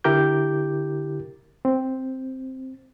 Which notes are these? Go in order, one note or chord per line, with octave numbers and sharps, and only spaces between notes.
D3 E4 G4 A#4 D6 G6
C4